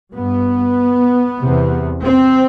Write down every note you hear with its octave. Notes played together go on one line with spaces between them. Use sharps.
G2 B3
E2 C3
C4